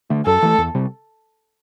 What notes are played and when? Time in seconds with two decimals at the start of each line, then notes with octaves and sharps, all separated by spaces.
0.10 D3 A3
0.26 F#2 A4
0.42 E3 A3
0.58 E2
0.75 C3 G3